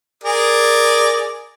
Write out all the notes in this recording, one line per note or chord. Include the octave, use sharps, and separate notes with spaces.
G#4 A#4 D5